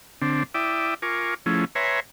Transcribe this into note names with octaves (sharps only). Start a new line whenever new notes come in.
D3 C4 D4
E4 D5 E5 G5 D6 D#6
F4 A#4 G#5 C#6 D6
F3 A3 C#4 E4 G#4
B4 C#5 E5 G#5 A#5 C6